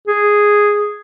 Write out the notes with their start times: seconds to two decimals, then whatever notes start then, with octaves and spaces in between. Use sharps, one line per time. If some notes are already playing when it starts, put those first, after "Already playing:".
0.08 G#4